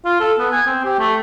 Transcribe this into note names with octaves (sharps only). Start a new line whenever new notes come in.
F4
A4
B3
G#5
C4
G4
A3